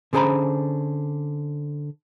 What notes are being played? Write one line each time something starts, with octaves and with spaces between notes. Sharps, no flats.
D3 C#4 G#4 C5 A#5 B5